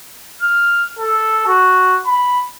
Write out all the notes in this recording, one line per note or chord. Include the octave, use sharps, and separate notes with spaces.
F6
A4
F#4
B5